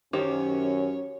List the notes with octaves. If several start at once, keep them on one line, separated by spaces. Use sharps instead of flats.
F#2 D#3 C#4 G4 C5 C#5